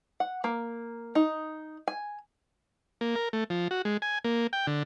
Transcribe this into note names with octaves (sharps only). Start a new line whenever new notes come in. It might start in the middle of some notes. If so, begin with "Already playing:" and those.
F#5
A#3
D#4
G#5
A#3
A#4
A3
F3
F#4
G#3
G#5
A#3
G5
D3